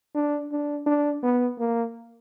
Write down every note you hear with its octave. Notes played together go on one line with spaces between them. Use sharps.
D4
D4
D4
B3
A#3